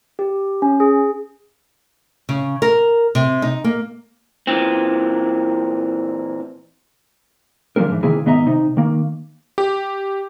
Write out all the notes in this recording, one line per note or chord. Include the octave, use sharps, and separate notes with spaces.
G4
C#4
G#4
C#3
A#4
C3
D#4
A#3
A#2 E3 C4
D3 F3 G3 G#3 C4 A#4
G#2 E3
C3 D#3 E3 A#3 E4 G#4
G#2 D#3 B3 D#5 E5 A#5
C3 D#4
D#3 A#3
G4